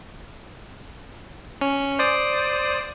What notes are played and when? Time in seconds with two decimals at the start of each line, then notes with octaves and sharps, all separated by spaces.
1.61 C#4
1.99 C5 D5 D#6